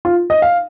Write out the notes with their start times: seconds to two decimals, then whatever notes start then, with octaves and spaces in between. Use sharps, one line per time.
0.05 F4
0.30 D#5
0.42 F5